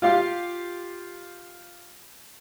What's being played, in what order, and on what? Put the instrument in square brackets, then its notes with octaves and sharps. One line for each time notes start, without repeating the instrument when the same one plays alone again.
[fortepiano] F4 G4 F5